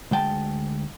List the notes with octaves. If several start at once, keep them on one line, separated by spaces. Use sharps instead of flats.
D2 G#3 G5 A5